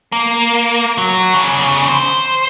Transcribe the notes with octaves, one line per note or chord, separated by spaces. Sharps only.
A#3
F#3
E2 C#3
C5